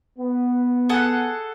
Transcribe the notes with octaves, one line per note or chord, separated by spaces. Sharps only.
B3
G#4 A4 F#5